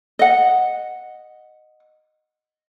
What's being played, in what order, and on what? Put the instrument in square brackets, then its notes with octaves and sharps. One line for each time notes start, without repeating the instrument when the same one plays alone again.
[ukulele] D#5 F#5